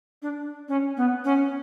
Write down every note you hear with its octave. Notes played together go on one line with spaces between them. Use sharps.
D4
C#4
B3
C#4